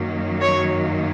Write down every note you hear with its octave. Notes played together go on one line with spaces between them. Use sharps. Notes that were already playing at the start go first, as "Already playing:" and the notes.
Already playing: F#2 D#3 F#3 A#3
C#5